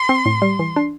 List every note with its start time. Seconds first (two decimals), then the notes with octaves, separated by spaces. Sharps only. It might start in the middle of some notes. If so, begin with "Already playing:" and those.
Already playing: C6
0.09 C4
0.26 A2
0.42 G3
0.59 E3
0.76 D4